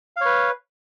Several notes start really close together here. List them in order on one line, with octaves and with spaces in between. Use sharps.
F5 C#5 B4